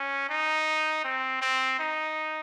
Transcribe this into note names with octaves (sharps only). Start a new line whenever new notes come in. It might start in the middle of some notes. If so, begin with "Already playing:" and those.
Already playing: C#4
D#4
C4
C4
D#4